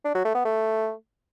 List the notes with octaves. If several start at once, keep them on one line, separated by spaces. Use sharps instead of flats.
D4
F#3
A3
B3
A3